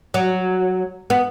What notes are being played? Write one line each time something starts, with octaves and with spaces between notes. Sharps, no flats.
F#3
B3